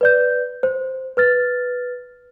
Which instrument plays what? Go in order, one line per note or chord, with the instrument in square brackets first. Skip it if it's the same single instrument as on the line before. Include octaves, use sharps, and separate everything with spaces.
[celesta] B4 D5 G6
C5
B4 F6 A6